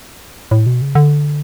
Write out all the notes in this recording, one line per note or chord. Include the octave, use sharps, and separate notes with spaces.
A2
B2
C#3
D3